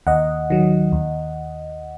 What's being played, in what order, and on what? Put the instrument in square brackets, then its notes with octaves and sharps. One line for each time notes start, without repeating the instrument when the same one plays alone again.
[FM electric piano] D#2 D#5 F#5
D#3 F#3
D#2